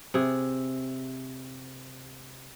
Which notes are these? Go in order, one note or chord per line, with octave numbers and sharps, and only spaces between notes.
C3 G#4